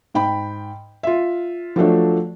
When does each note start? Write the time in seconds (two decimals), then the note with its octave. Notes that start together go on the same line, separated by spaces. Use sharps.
0.14 G#2 G5 B5
1.03 F4 E5
1.76 F3 F#3 A3 D4